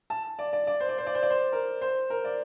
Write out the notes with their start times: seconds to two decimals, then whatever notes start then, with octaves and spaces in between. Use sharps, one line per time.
0.10 A5
0.39 D5
0.53 D5
0.67 D5
0.80 C5
0.89 D5
0.98 C5
1.07 D5
1.15 C5
1.23 D5
1.30 C5
1.52 A#4
1.82 C5
2.10 A#4
2.24 D5